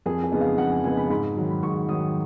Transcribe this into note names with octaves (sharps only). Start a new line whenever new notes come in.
F2 G#4
G#4
C#3 G#3 B3 D#4
F5
F2 F#5
G#5
C#3 G#3 B3 D#4 G#5
B5
G#2 B5
D#3 F#3
B5
G#2 C#6
D#3 F#3 D#6